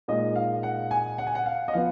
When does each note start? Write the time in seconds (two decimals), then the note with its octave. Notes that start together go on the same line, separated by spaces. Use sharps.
0.08 A#2 G#3 D#4 D#5
0.36 F5
0.63 F#5
0.91 G#5
1.18 F#5
1.27 G#5
1.35 F#5
1.46 F5
1.68 D#5
1.74 F3 B3 F5